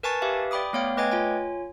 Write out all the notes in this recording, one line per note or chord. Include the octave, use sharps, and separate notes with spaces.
A#4 B4 G#5 A5 C#6 A6
G4 B4 E5 F5
D5 G5 B5 D6 D#6
A3 B3 C#5 F5 G5
A3 B4 D#5 G5 G#5 G#6
F4 C#5 G#5